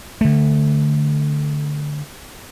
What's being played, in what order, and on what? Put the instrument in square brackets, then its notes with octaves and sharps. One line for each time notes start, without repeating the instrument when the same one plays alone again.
[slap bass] D3 A3